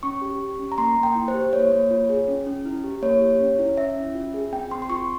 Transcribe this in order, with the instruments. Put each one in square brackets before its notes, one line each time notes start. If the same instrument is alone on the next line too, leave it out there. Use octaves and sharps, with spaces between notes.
[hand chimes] C#4 C#6
G4
G4
C#4
A#5
A#3 C6
A#3
G5
E4
C5
G4
A#3 C#5
A#3
F4
G#4
C#4
C#4
E4
G4
A#3 C#5
G4
C#4
E4
C#4 E5
C#4
F4
G#4
C4 G5
C4 C6
C6
F4 C#6